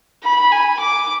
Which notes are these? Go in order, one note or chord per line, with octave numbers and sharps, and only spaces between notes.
B5
G#5
D6